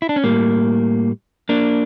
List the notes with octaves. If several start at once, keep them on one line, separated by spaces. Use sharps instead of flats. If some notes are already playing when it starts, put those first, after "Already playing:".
E4
D4
C#4
A2 G3 A#3
A#3 D4